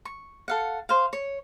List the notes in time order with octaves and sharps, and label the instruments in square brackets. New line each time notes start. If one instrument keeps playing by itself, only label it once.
[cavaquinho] C#6
A4 F5 F#5
C5 F5
C#5